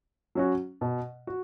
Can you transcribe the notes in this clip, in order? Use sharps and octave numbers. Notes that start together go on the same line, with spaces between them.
F#3 C#4 F#4
B2
F#4